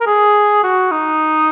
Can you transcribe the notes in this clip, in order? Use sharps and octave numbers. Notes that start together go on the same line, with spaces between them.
A#4
G#4
F#4
D#4